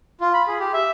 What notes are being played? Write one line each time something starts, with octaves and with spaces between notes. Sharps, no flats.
F4
B5
G#4
G4
E5